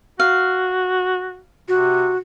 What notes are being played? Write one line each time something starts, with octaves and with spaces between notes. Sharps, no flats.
F#4 F5
C3 F#4